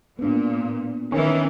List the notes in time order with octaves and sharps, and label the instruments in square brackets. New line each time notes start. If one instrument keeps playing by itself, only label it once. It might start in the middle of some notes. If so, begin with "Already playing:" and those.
[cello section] A#2 [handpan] B3 D4
[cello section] D#3 E3 [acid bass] C#4